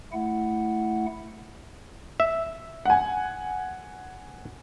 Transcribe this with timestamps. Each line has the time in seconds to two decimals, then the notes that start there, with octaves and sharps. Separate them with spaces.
0.13 A3 E4 F#5
2.20 E5
2.85 F#5 G#5